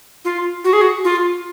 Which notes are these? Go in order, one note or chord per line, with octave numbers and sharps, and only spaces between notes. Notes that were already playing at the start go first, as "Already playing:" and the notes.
F4
F#4
G#4
F#4
F4